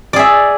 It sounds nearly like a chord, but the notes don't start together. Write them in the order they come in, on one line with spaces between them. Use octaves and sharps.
D5 G#4 E5